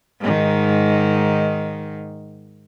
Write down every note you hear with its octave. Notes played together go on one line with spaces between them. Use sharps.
G#2 D#3